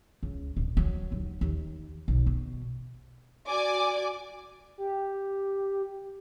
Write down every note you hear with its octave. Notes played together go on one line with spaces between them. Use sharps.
C#2
D1
F#3
D#2
D#2
B1
B2
F#4 D5 G#5 D6
G4